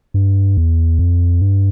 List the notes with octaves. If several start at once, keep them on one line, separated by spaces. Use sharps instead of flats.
G2
E2
F2
G2